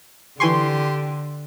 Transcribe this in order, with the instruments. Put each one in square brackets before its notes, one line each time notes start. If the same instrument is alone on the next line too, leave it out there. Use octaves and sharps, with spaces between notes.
[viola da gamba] D3 [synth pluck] E3 G#5 C#6 [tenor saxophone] G4 [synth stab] C6